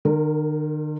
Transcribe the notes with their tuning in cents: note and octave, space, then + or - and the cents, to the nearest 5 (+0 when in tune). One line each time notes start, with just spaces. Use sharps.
D#3 -45 A#4 +0